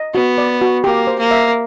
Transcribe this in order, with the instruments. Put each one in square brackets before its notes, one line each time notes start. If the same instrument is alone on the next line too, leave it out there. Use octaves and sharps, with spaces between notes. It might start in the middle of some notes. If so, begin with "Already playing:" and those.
Already playing: [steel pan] D#5
[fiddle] B3 [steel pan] F#4
[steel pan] D5
F#4
[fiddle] A#3 [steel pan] G4
[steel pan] C5
[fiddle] A#3
[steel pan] E5